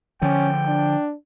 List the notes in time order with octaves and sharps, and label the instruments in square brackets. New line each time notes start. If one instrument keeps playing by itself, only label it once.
[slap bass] D3 F3 [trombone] C#4 [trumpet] G5
[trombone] D4